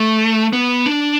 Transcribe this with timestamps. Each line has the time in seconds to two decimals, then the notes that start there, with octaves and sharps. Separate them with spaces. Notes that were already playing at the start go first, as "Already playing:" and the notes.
Already playing: A3
0.53 B3
0.86 D4